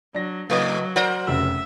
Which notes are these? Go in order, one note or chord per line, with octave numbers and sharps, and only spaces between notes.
F#3 D4 A#6
A2 C#3 F#3 A3 B4 D#5
F#4 A#4 C5 D5
F1 C#3 E5 E6